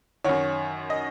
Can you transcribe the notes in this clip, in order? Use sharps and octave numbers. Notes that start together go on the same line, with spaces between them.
F#2 D#3 C#5 F#5
D#5